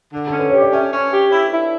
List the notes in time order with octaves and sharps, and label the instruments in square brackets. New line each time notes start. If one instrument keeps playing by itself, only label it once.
[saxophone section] D3
[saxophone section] C#4 [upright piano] A4
[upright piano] B4
[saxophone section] G4 [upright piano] C#5
[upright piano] D5
[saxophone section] C#4 [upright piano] E5
[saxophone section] C#4
G4
E4
E4